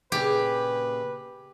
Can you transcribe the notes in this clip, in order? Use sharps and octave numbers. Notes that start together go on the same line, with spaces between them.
A#2 C#3 G4 G#4 B4